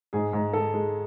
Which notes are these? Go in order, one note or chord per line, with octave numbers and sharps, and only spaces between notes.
G#2 G#4
G#2
G#2 A4
G#3